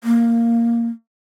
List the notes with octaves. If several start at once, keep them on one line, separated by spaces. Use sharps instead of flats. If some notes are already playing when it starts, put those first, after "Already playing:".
A#3